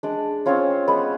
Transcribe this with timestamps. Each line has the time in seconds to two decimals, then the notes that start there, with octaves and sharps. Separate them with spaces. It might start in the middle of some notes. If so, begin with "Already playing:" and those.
0.03 G#3 D4 D5
0.46 C4 C#4 F4 C#5
0.88 G#3 B3 B4